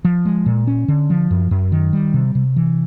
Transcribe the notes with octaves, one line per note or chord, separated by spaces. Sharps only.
F3
G#3
A#2
C#4
D3
F3
F#2
F#2
D#3
G3
C3
C3
E3